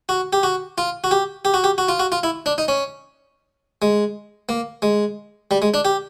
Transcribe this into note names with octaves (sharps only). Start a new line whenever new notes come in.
F#4
G4
F#4
F4
F#4
G4
G4
F#4
G4
F#4
F4
F#4
F4
E4
D4
D#4
C#4
G#3
A#3
G#3
G3
G#3
D4
G4